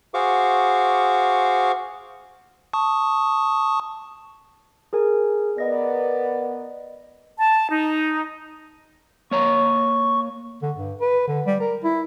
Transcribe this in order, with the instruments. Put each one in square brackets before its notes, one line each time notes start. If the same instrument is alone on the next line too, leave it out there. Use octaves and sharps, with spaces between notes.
[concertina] F#4 G#4 C5 F5 C#6 D6
[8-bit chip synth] A5 C#6 D#6
[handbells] G#4 A#4 G#5
[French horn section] B3 A#4 D5 [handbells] D#5 A#6
[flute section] A5
D#4
[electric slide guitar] A#3 C#5 A#5 [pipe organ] C#6
[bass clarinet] D3
G2
B4
D3
G3
A#4
E4